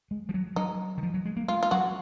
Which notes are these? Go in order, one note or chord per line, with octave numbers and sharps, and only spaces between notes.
G#3
F3
F#3
F#3 D#4
D#3
F3
F#3
G#3
A#3
G#3 F4
F4
F#3 F#4